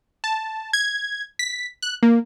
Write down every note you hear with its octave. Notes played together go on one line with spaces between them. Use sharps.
A5
G#6
B6
F#6
A#3